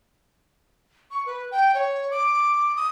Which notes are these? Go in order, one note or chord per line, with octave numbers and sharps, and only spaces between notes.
C#6
B4
G5
C#5
D6
D#6